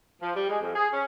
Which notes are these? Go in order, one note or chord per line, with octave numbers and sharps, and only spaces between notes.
F3
G3
G#3
F2
G#4
C#4